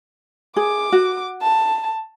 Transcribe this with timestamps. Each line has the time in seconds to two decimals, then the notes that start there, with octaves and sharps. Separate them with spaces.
0.56 G#4 D6
0.92 F#4
1.42 A5